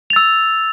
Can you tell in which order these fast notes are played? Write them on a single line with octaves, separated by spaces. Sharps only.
F7 A6 E6